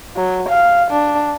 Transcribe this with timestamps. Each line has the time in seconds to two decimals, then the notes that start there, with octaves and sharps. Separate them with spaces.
0.16 F#3
0.48 F5
0.90 D4